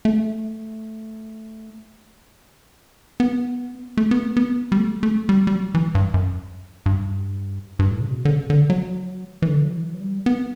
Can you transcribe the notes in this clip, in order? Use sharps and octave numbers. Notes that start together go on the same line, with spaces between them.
A3
B3
A3
B3
A3
B3
G3
A3
A3
G3
G3
F#3
E3
G2
F#2
G2
G2
A2
C#3
B2
D3
C#3
D3
F#3
E3
D3
F#3
E3
F#3
G3
B3